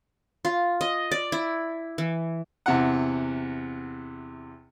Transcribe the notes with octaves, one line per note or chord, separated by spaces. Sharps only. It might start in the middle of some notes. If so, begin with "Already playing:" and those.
F4
D#5
D5
E4
E3
E2 C3 F#5